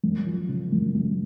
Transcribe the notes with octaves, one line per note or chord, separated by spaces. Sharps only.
F#2
F3
C#3
F#2
F#2